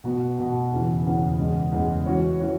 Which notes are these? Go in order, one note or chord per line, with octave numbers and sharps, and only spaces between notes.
B2 B3 F#4
B2 B3 F#4
E2 C#3 E3
E2 C#3 E3
E2 C#3 G#3
E2 C#3 G#3
E3 C#4 F#4 C#5
E3 C#4 F#4 C#5